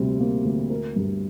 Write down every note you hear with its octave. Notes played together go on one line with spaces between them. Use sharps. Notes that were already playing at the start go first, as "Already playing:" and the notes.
Already playing: D2 C3 G3 A#3
A#3
D2
A#4
G2